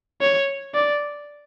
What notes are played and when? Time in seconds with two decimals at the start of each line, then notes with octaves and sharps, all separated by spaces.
0.21 C#5
0.75 D5